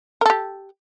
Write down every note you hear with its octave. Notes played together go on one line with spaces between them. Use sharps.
G4 A4 A#4